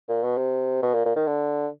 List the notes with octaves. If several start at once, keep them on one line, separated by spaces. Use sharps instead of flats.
A#2
B2
C3
B2
A#2
A#2
D#3
D3